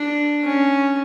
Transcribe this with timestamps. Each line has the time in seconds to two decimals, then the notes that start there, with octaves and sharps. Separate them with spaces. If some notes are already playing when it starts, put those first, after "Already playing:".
Already playing: D4
0.44 C#4